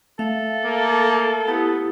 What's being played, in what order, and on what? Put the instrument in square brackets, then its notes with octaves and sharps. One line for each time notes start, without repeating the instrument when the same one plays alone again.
[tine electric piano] A3 [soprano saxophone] A4 [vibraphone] E5 F5
[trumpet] A#3
[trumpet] B3 [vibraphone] E4 G4 D#6